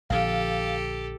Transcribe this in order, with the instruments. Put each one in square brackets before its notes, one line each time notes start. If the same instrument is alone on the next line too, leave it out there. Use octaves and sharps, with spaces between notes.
[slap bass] A#1 D3 F3 [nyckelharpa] G4 A4 [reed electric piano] F5